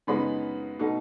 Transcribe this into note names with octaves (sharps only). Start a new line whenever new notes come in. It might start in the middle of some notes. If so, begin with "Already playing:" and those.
F#2 C#3 G#3 B3 D#4 B5
B2 A3 D#4